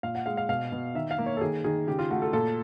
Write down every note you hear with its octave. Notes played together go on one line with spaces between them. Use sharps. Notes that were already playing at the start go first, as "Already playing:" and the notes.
A#2 F5
F#5
G#3 F5
F5
B2 F5
B2
D#3 E5
F5
A#3
C#5
A4
D#3 G#4
D#3 G#4
C#3 G4
F4
A3 F#4
A4
A#2 A4